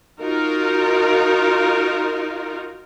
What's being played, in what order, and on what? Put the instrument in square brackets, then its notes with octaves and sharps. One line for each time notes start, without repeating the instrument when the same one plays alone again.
[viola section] D#4 F4 F#4 A#4